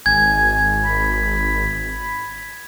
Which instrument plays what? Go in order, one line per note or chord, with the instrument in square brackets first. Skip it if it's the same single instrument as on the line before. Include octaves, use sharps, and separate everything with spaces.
[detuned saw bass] G#1 [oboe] G#5 [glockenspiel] G#6
[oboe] B5